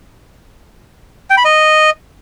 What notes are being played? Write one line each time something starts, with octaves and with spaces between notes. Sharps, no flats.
G5
B5
D#5